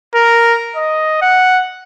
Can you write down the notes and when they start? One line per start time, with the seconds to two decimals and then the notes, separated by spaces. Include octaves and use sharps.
0.15 A#4
0.76 D#5
1.22 F#5